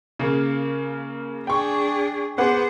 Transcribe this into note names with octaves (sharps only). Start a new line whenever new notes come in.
C#3 A#3
D4 G#4 G5 C#6
B3 G#4 C5 F#5 D6